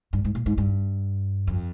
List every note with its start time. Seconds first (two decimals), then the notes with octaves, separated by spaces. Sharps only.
0.13 G2
0.25 G#2
0.35 A#2
0.46 G#2
0.58 G2
1.47 F2